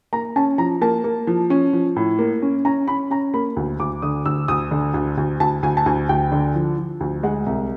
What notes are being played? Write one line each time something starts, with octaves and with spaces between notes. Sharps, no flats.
A#3 A#5
C#4 A5
F3 A#5
A#3 A5
A#3
F3
C#4
F3
A2
A#3
C#4
C#4 A#5
C#4 B5
C#4 A#5
A#3 B5
D2
D2 D6
D3 D#6
D2 E6
D2 D#6
D3
D2
D2
D2 A5
D2 G#5
A5
D2 G#5
D2 G5
D3
F3
F3
D2
G#3 F#5
C2 E5